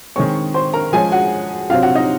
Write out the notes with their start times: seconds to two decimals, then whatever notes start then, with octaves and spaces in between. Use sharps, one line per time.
0.16 D#3 G#3 C4 C#5 C#6
0.54 C5 C6
0.74 A#4 A#5
0.93 F3 G#3 C#4 G#4 G#5
1.12 F#4 F#5
1.70 C3 F#3 C4 F4 F5
1.83 F#4 F#5
1.95 D#4 D#5